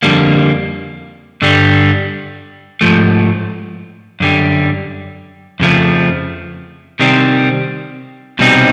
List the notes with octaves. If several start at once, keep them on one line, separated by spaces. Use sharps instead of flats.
F2 D3 G3 A#3
G2 D3 G3
G#2 F3 A3
F#2 D3 G3
F2 C#3 F3 A3
C3 D#3 G3 C4
C2 B2 G3 C4 D#4